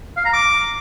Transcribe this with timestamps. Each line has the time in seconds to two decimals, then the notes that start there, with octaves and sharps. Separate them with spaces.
0.17 F5
0.25 A#5
0.33 D6